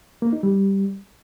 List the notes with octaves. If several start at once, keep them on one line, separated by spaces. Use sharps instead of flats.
A#3
D#4
G3